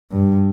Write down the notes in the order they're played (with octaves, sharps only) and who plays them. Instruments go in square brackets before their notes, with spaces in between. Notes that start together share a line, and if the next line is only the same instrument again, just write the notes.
[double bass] G2